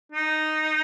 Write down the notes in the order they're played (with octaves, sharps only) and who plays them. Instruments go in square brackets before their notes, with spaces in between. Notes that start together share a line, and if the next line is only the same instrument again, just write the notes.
[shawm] D#4